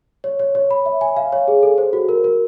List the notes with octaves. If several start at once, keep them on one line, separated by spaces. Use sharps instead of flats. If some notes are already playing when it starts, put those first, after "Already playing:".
C#5
C#5
C#5
B5
E5
G#5
F5
C#5
G#4
A4
C5
F#4
A#4
A#4